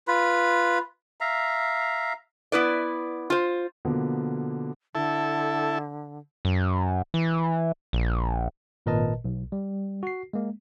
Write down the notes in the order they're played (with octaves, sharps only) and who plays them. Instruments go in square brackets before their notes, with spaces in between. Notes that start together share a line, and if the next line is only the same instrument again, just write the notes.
[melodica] F4 B4 B5
E5 F5 A#5
[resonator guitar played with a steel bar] B3 E4 B4 D5
F4 C5
[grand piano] B2 D3 F3 A#3 B3
[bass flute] D3 [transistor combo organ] E4 A4
[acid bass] F#2
E3
A#1
[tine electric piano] G#1 A#2 A#4 B4 D#5 A5
B1
G3
F#4 C7
G#3 A#3